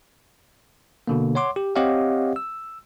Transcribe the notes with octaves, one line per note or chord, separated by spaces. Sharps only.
B2 D3 A#3
C#5 F#5 C6 D6
G4
C4 G4 C#5 D#5 F5 F#5
E6